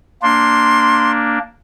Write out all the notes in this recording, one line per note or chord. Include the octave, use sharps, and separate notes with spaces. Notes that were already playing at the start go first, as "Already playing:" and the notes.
A#3 D4 C6